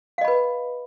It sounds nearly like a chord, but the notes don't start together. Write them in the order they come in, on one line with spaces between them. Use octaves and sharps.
F5 D#5 B5 B4